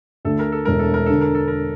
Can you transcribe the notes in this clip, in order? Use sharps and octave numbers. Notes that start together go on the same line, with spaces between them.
D2 A4
A#4
A4
E1 A#4
A4
A#4
D3 A4
A#4
A4
A#4